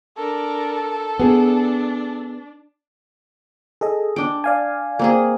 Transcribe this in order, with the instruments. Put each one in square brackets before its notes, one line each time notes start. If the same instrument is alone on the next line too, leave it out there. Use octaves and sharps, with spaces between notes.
[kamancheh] D4 A#4 [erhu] A4
[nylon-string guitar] B3 G#4 [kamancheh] D4
[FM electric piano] G#4 A4 D#5
[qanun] D4 G5
[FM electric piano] D5 F5 G#5
[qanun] A#3 C4 G#4